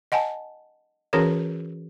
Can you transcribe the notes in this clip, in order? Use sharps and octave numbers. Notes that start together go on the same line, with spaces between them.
D#5 F#5 G#5 A5
E3 C#4 F#4 G#4 A#4 C#5